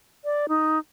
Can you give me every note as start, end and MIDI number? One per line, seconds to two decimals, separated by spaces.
0.25 0.46 74
0.49 0.79 63